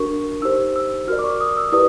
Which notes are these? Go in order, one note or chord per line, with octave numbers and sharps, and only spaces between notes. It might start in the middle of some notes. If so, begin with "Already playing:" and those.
Already playing: D4 F#4 A#4 C#6
D#4 G4 C5 E6
E6
F#4 A#4 D5 F6
D6
C#6
D#6
E6
E4 G4 B4 D5 D#6